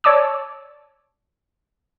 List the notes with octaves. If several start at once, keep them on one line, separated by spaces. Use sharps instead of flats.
C#5 D5 A5 D6 E6